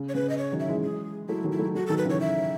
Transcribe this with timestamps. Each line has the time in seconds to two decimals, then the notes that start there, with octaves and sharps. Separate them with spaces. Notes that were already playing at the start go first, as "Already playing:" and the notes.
Already playing: C#3
0.09 C#5
0.15 C#3 B4
0.29 D#5
0.38 C#5
0.52 D#3 F#3
0.60 E5
0.68 E3 G#3
0.83 G#4
1.29 F#3 A3 E4
1.44 D#3 F#3
1.52 E4
1.59 F#3 A3
1.75 F#3 A3 F#4
1.87 A4
1.90 D#3 F#3
1.98 B4
2.05 C#3 E3 C#5
2.21 E5